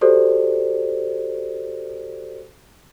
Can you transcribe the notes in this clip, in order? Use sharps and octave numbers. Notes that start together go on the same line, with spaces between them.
F#4 G4 A4 C5 D5